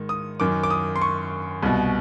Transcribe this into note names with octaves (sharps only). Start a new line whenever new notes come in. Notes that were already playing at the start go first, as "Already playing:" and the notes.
Already playing: G#2 D#3
D#6
F#2 D#3 D6
D6
D#6
C6
C#6
C2 B2